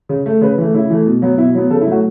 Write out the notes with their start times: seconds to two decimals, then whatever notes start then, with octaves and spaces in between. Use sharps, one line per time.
0.09 C#3
0.26 A3
0.41 C#3 B4
0.58 E3 A3
0.74 C#3 E4
0.90 E3 A3
1.06 B2
1.22 F#3 B3
1.38 B2 E4
1.55 F#3 B3
1.71 C#3 A4
1.81 E4
1.87 F#3 A3 F#4